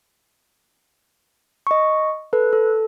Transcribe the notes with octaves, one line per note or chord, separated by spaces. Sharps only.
D#5 C#6
A4 B4
A4